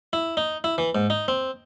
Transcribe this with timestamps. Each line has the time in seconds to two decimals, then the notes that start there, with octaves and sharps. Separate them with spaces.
0.13 E4
0.37 D#4
0.64 E4
0.78 E3
0.95 G#2
1.10 D#4
1.28 C4